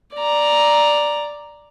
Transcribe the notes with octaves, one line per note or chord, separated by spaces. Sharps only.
D5 A#5